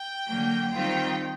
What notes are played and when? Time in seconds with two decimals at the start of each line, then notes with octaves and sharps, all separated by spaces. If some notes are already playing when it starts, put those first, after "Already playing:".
Already playing: G5
0.27 D3 F#3 A#3
0.72 D#3 G3 C4 F4 G5